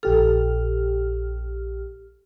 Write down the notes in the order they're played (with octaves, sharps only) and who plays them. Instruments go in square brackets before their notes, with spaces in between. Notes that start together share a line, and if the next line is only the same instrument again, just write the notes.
[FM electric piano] A#1 G4 F6 [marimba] A4